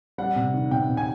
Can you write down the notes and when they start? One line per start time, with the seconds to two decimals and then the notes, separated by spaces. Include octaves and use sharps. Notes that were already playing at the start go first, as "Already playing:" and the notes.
0.18 G3 F#5
0.36 C3
0.54 D#3
0.71 C3 G5
0.89 C3
0.97 G#5